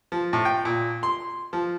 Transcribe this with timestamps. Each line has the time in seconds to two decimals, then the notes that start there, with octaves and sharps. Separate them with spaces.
0.12 F3
0.33 A2
0.45 G5
0.65 A#2
1.03 C6
1.53 F3